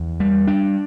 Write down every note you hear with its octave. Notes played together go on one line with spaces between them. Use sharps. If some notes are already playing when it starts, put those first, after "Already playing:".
Already playing: E2
G3
D4